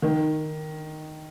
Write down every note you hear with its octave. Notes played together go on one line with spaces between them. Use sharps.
D#3